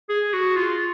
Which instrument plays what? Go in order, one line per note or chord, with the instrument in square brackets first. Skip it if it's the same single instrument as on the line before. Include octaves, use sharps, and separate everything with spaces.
[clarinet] G#4
F#4
F4